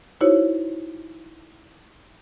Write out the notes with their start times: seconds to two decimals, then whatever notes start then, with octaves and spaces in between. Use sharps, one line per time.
0.21 D#4 E4 F#4 C5 C#5